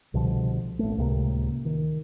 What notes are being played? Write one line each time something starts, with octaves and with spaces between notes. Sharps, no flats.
C2 B2 D3 F3
A1 A3
C#2 A2 C3 A#3
D#3